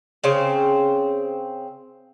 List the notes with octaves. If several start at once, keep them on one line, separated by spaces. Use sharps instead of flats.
C#3 C4